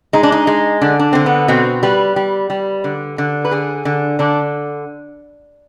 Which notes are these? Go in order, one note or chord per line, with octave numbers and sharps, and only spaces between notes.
G#3 D#4
D4
D#4
G#3
D3 D4
D4
D3 C4
B3
B2 C4
G3 B4
G3
G3
D3
D3
B4
D3 G#4
D3
D3 D4